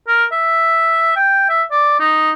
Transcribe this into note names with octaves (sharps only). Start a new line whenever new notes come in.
A#4
E5
G5
E5
D5
D#4